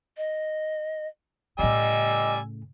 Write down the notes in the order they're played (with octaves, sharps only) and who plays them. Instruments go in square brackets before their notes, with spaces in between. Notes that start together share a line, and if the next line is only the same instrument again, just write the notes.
[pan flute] D#5
[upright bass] A2 C#3 [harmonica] G3 G#5 E6 [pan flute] D#5